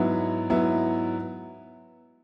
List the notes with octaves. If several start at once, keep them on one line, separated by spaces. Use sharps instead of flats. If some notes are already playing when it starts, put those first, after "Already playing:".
Already playing: G#2 F#3 B3 E4
G#2 F#3 B3 E4